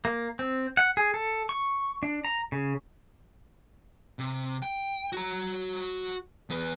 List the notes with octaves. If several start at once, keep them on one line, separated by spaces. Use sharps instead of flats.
A#3
C4
F#5
G#4
A4
C#6
D4
A#5
C#3
C3
G5
F#4 A#5
E2 B4